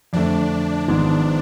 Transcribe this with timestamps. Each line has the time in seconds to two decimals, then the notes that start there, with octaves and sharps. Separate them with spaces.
0.13 F2 D3 A3 D4
0.88 G#1 G#2 F3 G#3 B3